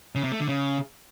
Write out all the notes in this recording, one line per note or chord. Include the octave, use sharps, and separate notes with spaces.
C#3
C3
A3
D3
C#3